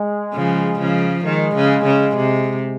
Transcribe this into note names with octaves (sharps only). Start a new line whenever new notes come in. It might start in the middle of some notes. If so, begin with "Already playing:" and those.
Already playing: G#3
C#3 F3
C#3 F3
D#3 G#3
C#3
C#3
C3